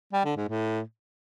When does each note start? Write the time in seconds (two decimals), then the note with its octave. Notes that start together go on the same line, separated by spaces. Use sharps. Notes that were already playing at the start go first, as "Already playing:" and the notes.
0.13 G3
0.25 D3
0.37 G#2
0.48 A2